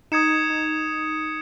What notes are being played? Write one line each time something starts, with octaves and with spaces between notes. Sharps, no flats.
D#4 D#6 G#6 C#7 E7
D#4
D#4